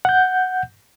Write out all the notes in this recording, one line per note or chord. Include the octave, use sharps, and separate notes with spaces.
F#5 G6